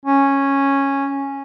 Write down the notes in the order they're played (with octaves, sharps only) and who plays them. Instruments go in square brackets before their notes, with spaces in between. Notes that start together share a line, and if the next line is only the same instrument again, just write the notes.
[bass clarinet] C#4